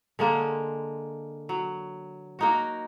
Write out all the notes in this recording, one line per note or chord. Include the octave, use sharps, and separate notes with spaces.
D3 G#3 A#3
F#3
A#3 D#4 F#4